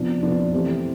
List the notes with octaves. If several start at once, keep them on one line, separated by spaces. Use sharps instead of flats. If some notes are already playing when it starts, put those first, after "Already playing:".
Already playing: C3 F3 B3 D4
C3 F3 B3 D4
E3 A3 C4 G4 C5